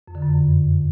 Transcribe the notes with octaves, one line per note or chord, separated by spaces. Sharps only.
F2
D3
F#2
F2